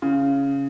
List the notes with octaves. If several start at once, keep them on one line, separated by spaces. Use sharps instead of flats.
C#3